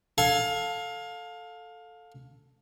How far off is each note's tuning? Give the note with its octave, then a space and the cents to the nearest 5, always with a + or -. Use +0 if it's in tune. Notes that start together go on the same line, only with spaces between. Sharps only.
A4 +0 F5 +20 G#5 +0